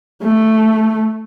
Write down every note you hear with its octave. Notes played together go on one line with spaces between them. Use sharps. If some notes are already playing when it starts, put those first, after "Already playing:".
A3